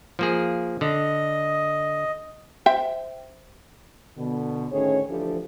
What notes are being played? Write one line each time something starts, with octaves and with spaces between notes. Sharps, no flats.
F3 A#3 G#4
D3 D#5
C5 E5 G5
B2 D3
D2 A2 D#3 C#4 G#4 C#5
D2 E3 F3 D4 G4 A4